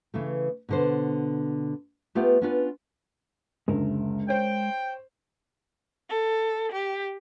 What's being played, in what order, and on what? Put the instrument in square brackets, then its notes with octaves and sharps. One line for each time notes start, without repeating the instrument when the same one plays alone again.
[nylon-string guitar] C#3 E3 A3
B2 D3 C5
A3 B3 F4 G4 B4
B3 C#4 D4 F4 F#4 B4
[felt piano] F#1 D2 [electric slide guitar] G#3 A#4 E5
[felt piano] C5 C#5 [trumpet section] G5
[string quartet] A4
G4